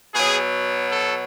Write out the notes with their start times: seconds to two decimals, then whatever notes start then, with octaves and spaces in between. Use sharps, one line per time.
0.14 B2 F#3 G#4
0.91 A4